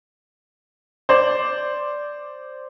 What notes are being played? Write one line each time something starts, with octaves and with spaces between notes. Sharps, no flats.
C5 D5